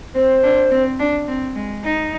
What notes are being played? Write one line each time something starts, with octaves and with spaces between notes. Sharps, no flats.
C4 C5
D4
C4
D4
C4
G#3
D#4